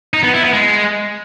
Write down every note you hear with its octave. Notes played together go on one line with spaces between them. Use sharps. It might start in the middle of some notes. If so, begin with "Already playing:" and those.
D#4
B3
E4
B3
G#3